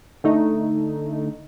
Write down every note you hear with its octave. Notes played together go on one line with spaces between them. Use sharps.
D3 A3 D#4